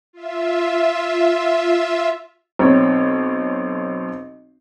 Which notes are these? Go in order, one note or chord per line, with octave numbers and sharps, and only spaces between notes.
F4 E5
B1 C4 C#5